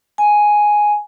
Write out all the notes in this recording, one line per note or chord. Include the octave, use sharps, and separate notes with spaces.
G#5